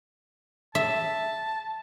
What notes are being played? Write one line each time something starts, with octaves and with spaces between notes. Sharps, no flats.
E5 A5